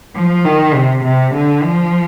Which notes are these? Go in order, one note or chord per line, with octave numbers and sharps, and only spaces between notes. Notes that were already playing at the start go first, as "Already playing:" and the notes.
F3
D#3
C3
C3
D3
F3